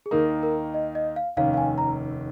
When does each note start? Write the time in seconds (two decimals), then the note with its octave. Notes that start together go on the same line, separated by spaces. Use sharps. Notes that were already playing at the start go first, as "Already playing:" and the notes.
0.06 G#4
0.11 D#2 D#3 A#3 D#4 A#4
0.43 A#4
0.74 D#5
0.95 D#5
1.16 F5
1.37 F1 D#2 D#3 C#4 F5
1.54 F5
1.57 G#5
1.78 A#5